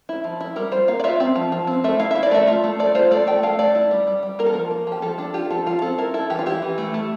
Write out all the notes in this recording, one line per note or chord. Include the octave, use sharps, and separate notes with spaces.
E4
F3
E4
G3 A#4
F4 C5
A#3 F5
D5
F4 E5
C4
F3
F3
C4
A3 E5
E4 F5
E4 E5
D5
A3 E5
F4
A3
A3 D5
F4 C5
A3 D5
A3 G5
A3 F5
A3 D5
E4
G3
G3
G3
A#3 A#4
A4
F3 A#4
A#3
F3 G4
F3 A4
D4 A4
F4 G4
F3 A4
F3 F4
C4 A4
E4 A#4
E4 A4
E3 G4
F4
E4 G4
E3
A3
A3